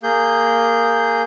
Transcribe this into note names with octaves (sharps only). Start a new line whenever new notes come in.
A#3 G#4 G6